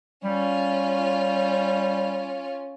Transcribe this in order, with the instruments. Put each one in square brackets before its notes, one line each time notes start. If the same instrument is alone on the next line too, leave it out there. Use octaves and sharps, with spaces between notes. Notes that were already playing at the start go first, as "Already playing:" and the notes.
[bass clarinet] G3 [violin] C#4 F4